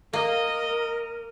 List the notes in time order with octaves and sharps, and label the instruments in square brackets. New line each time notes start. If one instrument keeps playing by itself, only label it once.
[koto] A#3 [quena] A#4 [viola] D#5